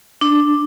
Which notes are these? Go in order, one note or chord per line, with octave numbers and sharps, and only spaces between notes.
D4